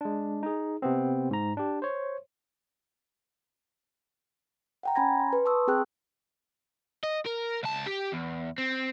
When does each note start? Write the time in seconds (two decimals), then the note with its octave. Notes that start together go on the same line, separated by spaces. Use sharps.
0.01 G#3 D4
0.43 D#4 G#4
0.82 C3 B3 C4
1.31 G#2 A#5
1.57 D4 G4
1.82 C5 C#5
4.83 F#5 G5 A#5
4.95 C#4 G#5 A#5 B5 G#6 A#6
5.20 C6
5.33 B4
5.45 A5 C6 C#6 D#6 E6
5.67 C4 G#4 G5 F#6
7.03 D#5
7.26 A#4
7.63 C#2 A5
7.86 G4
8.12 E2
8.58 C4